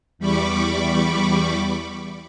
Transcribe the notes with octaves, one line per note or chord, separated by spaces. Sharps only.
E2 G3 B5 C#6 D6